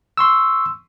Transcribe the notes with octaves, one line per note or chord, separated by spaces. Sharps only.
C6 C#6 E6